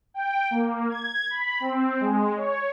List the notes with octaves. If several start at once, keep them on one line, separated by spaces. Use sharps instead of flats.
G5
A#3
G#6
B5
C4
G#3
C#5